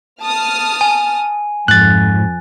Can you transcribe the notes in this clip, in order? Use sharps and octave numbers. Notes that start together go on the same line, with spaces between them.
A5 D#6 F6
G#5
F2 G#2 F#6 A6